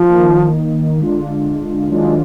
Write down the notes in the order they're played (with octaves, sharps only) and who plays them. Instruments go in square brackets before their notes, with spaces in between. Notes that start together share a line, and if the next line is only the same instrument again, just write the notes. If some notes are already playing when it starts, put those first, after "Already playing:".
Already playing: [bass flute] F3
[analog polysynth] D#3 A#3 D#4
D3 G#3 D4 F4
[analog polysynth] D#3 F#3 D4 F4 [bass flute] G#3